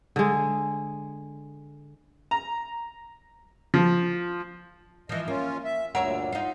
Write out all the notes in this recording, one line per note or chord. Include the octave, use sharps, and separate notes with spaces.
D3 G#3
A#5
F3
E3 F3 D#5
A#3 C#4 F4
E5
D2 G2 A#2 A#4 C#5 E5 F#5
D#4 F4